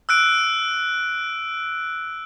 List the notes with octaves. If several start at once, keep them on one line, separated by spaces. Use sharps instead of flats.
E6 F#6 D7